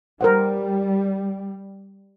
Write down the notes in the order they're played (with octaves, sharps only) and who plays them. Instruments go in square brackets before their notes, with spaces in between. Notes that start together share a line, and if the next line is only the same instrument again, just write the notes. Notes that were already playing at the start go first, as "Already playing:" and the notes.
[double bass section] G3 [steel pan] A#4 C5 F#5